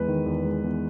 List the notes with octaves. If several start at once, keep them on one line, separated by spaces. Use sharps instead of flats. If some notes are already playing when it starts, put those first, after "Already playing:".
Already playing: E2 G#3 B4
D#3
E2
G#3
E2